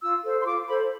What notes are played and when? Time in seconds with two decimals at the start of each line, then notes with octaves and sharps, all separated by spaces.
0.01 F4 E6
0.24 A4 C5
0.41 C6
0.46 F4 D6
0.68 A4 C5 B5